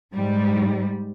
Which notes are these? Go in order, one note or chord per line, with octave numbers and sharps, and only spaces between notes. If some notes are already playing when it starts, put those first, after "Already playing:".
G#2 G3